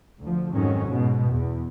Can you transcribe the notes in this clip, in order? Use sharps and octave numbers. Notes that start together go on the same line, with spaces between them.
D2 F3
F2 G#2 D#3 F#3 C#4
G#2 B2
E2